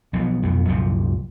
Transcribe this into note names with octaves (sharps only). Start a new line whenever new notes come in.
B1 F3 B3
B1 F2 B3
C2 F#2 A#2 F3